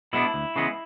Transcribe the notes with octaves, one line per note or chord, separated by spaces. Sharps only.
B2 G#3 B3 D4 E4
D2
C#3 E3 G#3 B3